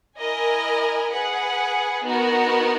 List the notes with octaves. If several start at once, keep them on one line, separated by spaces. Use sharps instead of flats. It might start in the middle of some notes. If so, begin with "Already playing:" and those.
E4 A#4 D#5 G#5
G#4 B4 F#5
B3 D#4 F#4 A#4